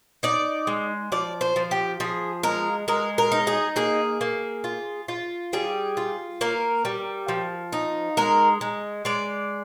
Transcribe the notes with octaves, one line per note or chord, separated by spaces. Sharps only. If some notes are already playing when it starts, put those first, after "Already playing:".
D#4 D5
G#3
F3 D5
C5
F3
G4
F3 G#4
G#3 A#4
G#3 A#4
A#4
D#4
G#4
A#3 G#4
A#3
F4
F4
G3 G#4
F4
A#3 A#4
G3
F3
D#4
G#3 A#4
G#3
G#3 D5